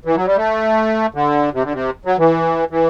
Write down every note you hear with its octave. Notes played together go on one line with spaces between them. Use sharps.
E3
F#3
G3
A3
D3
C3
D3
C3
F#3
E3
E3